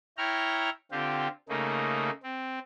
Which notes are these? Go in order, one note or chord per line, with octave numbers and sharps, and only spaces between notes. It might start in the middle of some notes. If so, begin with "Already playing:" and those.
E4 C#5 G5 A#5 F6
D3 C4 F4 G4
C#3 A3 A#3 D#4
C4